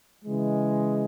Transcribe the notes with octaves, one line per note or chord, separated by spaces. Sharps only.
C#3 E3 G#3